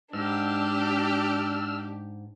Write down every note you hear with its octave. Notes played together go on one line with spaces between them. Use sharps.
G#2 D4 G4 E6 F6